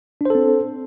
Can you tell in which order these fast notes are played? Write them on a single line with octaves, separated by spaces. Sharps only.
D4 C5 A4 C4